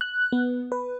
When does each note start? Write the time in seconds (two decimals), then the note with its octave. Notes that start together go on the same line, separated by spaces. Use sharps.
0.01 F#6
0.32 B3
0.72 B4